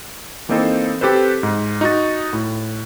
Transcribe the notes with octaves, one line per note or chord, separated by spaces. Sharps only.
E3 A#3 C4 D#4 A4 C5
C4 G4 A4 B4 C5
G#2
D#4 F#4 A6
A2